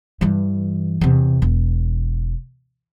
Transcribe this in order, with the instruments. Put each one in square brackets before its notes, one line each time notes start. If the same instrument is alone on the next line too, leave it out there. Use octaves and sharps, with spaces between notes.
[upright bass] G2 E3
E2 C3
E1